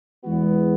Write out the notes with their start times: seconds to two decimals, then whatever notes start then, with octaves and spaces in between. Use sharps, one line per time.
0.24 E2 E3 G#3 B3 F#4